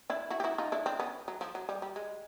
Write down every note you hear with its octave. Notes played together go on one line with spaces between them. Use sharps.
D4 E4
E4 F#4
G4
E4 F#4
D#4 F4
D4 E4
C4 D4
B3 C#4
F#3
F3
F#3
G3
G3
G#3